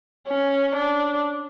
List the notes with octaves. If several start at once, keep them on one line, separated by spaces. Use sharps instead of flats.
C#4
D4